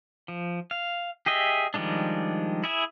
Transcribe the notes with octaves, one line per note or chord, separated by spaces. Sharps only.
F3
F5
G4 G#4 D#5 E5
D#3 F3 G3 G#3 D4
E4 G#4 E5